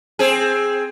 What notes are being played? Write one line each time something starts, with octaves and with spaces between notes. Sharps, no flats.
C4 G#4